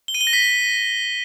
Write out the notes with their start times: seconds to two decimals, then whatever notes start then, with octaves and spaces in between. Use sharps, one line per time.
0.08 G7
0.14 D#7
0.21 G7
0.27 A#6
0.33 B6